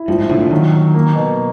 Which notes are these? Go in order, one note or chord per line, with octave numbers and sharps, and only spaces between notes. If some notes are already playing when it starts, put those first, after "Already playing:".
Already playing: E4
G2 F3
G#2
A2 D3
A#2
D#3 F#3
F#3
A#3
B2